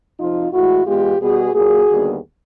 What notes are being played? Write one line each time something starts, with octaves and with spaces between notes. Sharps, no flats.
F2 C3 F3 D#4 F4
A2 E3 G#3 E4 F#4
E2 B2 G#3 B3 F4 G4
B2 G3 B3 F#4 G#4
A#2 F#3 A#3 F#4 G#4
D#2 D3 G3 B3